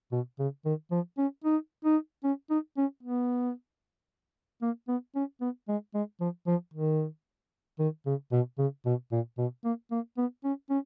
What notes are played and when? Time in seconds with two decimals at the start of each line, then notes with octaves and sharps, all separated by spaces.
0.12 B2
0.39 C#3
0.65 D#3
0.91 F3
1.18 C#4
1.44 D#4
1.85 D#4
2.24 C#4
2.50 D#4
2.77 C#4
3.03 B3
4.62 A#3
4.88 B3
5.15 C#4
5.41 B3
5.68 G#3
5.94 G#3
6.21 F3
6.47 F3
6.73 D#3
7.79 D#3
8.06 C#3
8.32 B2
8.58 C#3
8.86 B2
9.12 A#2
9.38 B2
9.64 A#3
9.91 A#3
10.17 B3
10.44 C#4
10.70 C#4